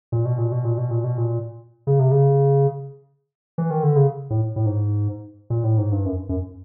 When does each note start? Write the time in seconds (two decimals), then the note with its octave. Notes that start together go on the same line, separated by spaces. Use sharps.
0.12 A#2
0.25 B2
0.38 A#2
0.52 B2
0.64 A#2
0.78 B2
0.91 A#2
1.04 B2
1.18 A#2
1.87 C#3
1.99 C3
2.11 C#3
3.58 E3
3.70 D#3
3.83 D3
3.96 C#3
4.30 A2
4.56 A2
4.66 G#2
5.50 A#2
5.64 A2
5.78 G#2
5.92 G2
6.06 F#2
6.29 F#2